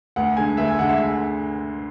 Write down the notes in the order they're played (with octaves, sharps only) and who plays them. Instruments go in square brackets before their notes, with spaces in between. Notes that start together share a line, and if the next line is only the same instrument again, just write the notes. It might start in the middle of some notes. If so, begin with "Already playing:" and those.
[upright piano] D2 [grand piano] F#5
[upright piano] D3 G#3 [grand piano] G#5
[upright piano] D2 [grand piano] E5
[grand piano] G#5
[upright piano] D3 G#3 [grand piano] F#5
[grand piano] E5